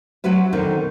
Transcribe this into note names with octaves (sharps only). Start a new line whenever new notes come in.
F#3 C4 F#4 B4 E5
B2 D3 D#3 C4 D#4